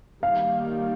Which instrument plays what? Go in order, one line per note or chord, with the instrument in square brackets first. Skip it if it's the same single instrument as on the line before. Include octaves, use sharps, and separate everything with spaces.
[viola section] D#3 G3 A#3 [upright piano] F5